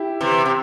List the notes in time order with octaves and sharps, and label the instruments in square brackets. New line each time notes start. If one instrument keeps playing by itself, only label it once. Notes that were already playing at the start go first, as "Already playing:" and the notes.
Already playing: [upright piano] E4 G4
[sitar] C3 E3
C3